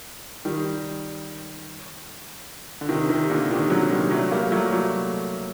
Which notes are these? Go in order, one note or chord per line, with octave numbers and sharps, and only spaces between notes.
D#3 G3
D3
C3 D#3
C3 D#3
A#2 D3
C3 D#3
D3 F#3
D#3 G3
F#3 A3
G3 A#3
F#3 A3
F#3 A3